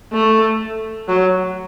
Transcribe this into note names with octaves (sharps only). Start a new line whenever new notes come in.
A3
F#3